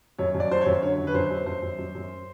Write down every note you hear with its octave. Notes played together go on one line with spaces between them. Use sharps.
F#2 C#5
F#2
D5
F#3 C5
C#5
F#2
D3 C#5
F#2
B4
F#2 C5
F#2
F#2 C5
F#2
F#2
F#2